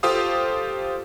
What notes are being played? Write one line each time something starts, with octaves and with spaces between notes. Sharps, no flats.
F4 G4 A4 C5 F5 D#6